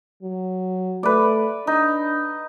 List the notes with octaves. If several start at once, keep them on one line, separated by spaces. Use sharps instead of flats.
F#3
A3 B4 D5
D4 D#4